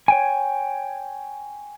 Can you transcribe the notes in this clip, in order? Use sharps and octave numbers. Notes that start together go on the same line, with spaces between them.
C#5 G5 G#5